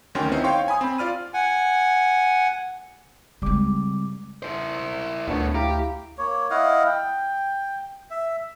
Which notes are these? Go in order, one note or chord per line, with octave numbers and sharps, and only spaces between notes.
D2 D#3 F#3 C#4 G5 C6
B3 C4 D#4 E4 C5
C#5 F5 G5 C6 C#6
G#5 B5 D#6
C4 B5
F4 D5 F6 D#7
F#5 G#5
C#3 G3 G#3 C4 D6
E4 C5
D2 A#2 A3 B3 D4 C#5
E4 G4 F5 A#5
A#3 C#5
E4 D#5 F5 F#5
G5
E5